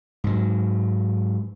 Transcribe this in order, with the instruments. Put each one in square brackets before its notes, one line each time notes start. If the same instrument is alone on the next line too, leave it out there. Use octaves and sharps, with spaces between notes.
[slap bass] G#2 F#3